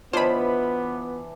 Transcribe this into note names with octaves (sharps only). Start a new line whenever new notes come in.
E3 B3 D4 F4 C5 C#5 D#5 B5